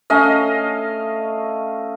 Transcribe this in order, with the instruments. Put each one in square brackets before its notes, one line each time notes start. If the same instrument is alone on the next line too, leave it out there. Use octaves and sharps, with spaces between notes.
[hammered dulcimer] A3 C#4 D#5 F5